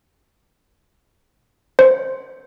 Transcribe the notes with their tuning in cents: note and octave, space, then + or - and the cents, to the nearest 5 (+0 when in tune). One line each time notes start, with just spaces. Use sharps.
C5 +0